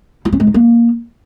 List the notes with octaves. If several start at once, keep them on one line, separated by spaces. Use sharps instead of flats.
E4
C#4
G#3
D#4
A#3